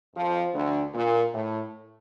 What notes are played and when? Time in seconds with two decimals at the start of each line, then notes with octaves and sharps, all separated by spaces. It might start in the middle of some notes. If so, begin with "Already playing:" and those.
0.15 F2 F3
0.54 D2 D3
0.94 A#2
1.34 A2